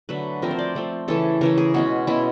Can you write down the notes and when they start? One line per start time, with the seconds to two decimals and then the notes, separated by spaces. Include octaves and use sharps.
0.09 D3 F#3 A3 B4
0.42 F3 A3 C4 A#4
0.51 C5
0.59 D5
0.75 F3 A3 C4
1.08 C#3 E3 A3 A4
1.41 C#3 E3 A3 A#4
1.58 G#4
1.74 B2 G#3 C#4 F#4
2.07 B2 G#3 C#4 E4